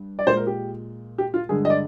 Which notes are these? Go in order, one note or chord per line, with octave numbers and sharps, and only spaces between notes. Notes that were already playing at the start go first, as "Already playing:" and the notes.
Already playing: G2
D5
A#2 G#3 C5
A#4
G4
G4
F4
G2 D3 G#3 G#4
D#5
D5